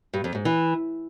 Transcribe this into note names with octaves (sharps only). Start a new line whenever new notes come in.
G2
F2
G#2
E3